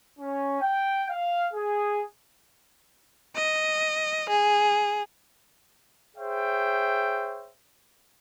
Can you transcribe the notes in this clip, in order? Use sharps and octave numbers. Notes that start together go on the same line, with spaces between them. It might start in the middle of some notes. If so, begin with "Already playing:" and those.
C#4
G5
F5
G#4
D#5
G#4
G#4 C5 C#5 E5 G5